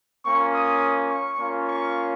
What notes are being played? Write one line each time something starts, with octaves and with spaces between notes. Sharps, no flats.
A#3 C#4 F4 C#6
D#6
C#6
A#3 C#4 F4
C#6